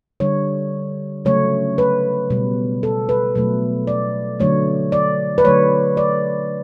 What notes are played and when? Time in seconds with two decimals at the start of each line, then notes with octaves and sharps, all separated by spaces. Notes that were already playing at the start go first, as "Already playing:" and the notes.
0.20 D3 G3 C#5
1.25 C#3 F#3 A3 C#5
1.78 B4
2.30 B2 G3
2.83 A4
3.09 B4
3.35 B2 F#3 A3
3.87 D5
4.40 D3 F#3 A3 C#5
4.92 D5
5.38 B4
5.45 D3 F#3 A3 C#5
5.97 D5